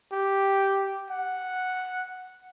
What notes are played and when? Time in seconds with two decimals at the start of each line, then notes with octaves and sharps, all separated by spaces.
0.13 G4
1.11 F#5